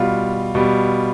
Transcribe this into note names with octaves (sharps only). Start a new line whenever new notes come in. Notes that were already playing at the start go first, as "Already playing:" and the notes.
Already playing: B2 G3 F4
B2 G3